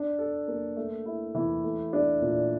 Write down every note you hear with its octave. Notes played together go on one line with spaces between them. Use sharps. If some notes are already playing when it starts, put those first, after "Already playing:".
Already playing: D4
A4
A#3
A3
E4
E3
A3
D4
A#2